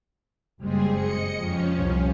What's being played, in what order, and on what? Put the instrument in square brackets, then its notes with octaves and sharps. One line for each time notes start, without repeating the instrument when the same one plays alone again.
[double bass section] F#1 G#3 C4 [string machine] G3 G#4
[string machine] D#5 C#7
[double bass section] F2 [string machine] F3 C#4
[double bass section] C2